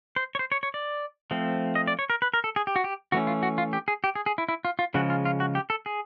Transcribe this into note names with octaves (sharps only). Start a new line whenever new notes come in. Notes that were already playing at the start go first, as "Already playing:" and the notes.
C5
C#5
C5
C#5
C#5
D5
F3 A3 C4
D#5
D5
C#5
A#4
B4
A#4
A4
G#4
G4
F#4
G4
E3 A3 C#4 F#4
F4
F#4
F4
G4
G#4
G4
G#4
G#4
E4
E4
F4
F4
C#3 F3 G#3 F#4
F4
F4
F#4
G4
A4
G#4